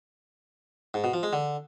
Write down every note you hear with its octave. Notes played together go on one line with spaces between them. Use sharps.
G#2
B2
F3
G#3
D3